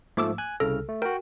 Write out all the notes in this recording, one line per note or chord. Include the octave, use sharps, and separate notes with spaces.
G#2 F3 A3 A#3 D6 E6
G#5 F#6 G#6
C2 C#3 A4 F6
A3
F#4 A#4 G5